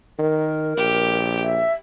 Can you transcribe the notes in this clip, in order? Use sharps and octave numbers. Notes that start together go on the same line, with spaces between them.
D#3 A#4
A#1 G4
E5